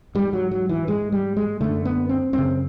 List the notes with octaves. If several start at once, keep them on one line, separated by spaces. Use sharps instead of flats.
G#2 G3
F#3
F#3
E3
G#2 G#3
G3
G#3
F#2 D3 A3
B3
C4
F#2 C#3 C4